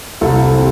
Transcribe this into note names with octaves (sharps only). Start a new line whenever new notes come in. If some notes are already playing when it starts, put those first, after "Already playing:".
C2 A4
C3